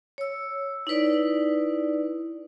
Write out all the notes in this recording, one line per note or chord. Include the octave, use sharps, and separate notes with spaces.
C#5 E6
D#4 E4 B4 D5